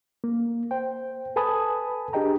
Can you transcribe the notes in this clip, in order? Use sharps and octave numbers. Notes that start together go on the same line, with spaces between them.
A#3
C5 G5
A4 B4 G#5 A5 B5 D#6
D4 G4 G#4 D#5 G5 A#5